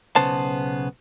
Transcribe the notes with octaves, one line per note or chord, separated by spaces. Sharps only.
B1 C#3 B3 C5 A5